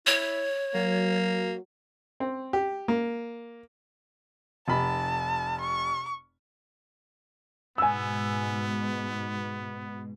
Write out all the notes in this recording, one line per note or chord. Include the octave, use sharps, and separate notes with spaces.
E4 C#5
F#3 A#3
C4
G4
A#3
F1 A5 B5
C#6
G#2 B2 B3 G#5 E6